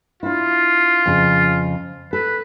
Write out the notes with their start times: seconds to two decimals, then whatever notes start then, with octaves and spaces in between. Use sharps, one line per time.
0.23 D4 E4 F4
1.06 F2 C#3
2.13 A4 B4